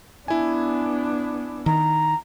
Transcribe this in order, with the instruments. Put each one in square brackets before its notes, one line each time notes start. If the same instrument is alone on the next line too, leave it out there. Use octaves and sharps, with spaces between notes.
[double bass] B3 D4 [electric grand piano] E4 G#5
[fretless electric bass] D#3 [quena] A#5